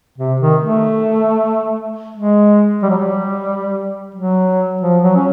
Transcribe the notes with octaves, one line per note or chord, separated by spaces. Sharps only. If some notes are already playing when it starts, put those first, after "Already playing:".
C3
D#3
A3
G#3
G3
F#3
G3
F#3
F3
F#3
C#4